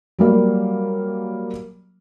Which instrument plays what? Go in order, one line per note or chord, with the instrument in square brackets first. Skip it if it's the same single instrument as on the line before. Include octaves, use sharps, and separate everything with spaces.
[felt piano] F#3 G3 A#3